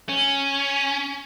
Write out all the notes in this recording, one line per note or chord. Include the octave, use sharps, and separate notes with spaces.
C#4